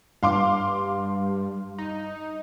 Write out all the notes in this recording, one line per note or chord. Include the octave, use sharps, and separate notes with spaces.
G2 F5 C6 D6
D#4